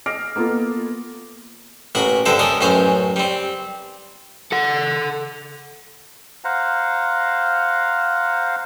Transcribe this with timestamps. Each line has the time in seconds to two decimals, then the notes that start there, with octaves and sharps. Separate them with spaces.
0.06 D#5 D6 F6 A#6 C7 D7
0.36 A#3 B3 F4 A4
1.95 A1 A#3 F#4 B5
2.26 G2 D3 A4 C5 F5
2.39 A#3 C#4 A4 D#5
2.61 A1 F#2 C#4 C5 F5
3.16 G3 C4
4.52 A4 F#5
6.45 C5 F5 F#5 A#5